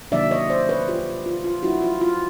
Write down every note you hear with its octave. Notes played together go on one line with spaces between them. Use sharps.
C3 D#3 F#3 A#3 D4 D5 E5
C#5 D#5
C5 D5
B4 C#5
F4 G4
F4
F4
F#3 A3 D4 E4 F#4
F4
F4